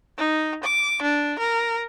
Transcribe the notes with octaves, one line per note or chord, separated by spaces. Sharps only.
D#4
D6
D4
A#4